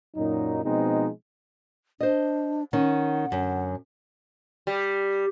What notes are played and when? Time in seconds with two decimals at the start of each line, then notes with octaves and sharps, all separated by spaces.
0.16 F#2 A#2 F#3 D#4
0.65 B2 F3 G#3 C4 D#4
2.01 D4 C5 D#5
2.73 D#3 C#4 F#5
3.30 F#2 D3
4.67 G3